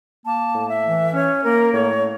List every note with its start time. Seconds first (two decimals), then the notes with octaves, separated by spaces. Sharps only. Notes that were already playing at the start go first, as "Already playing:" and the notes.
0.25 A#3 A5
0.54 A2
0.69 E5
0.83 E3
1.14 C#4 C#5
1.43 A#3 A#4
1.72 A2 C#5